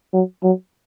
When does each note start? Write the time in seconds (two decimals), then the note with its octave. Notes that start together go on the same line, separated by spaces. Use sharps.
0.13 F#3
0.43 F#3